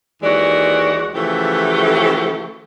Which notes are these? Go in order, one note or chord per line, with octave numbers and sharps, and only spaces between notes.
D#2 E3 G#3 F#4 D5
C#3 E3 F3 A3 F#4 G4